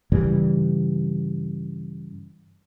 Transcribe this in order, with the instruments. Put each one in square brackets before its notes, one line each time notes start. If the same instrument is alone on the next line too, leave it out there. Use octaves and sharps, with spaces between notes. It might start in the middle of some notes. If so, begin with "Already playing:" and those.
[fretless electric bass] G2 C#3 E3 G3